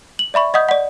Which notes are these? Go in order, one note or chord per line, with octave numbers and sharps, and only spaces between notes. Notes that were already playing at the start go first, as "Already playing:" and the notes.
F#7
D5 E5 B5 C#6
D#5 F#5 D#6 G6
D5 F#5